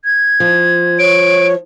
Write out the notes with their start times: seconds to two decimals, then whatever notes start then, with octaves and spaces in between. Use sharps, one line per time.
0.05 G#6
0.40 F3
0.99 C#5 D7